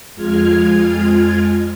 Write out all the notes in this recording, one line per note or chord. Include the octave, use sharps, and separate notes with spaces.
F2 G#3 F4 F6 G#6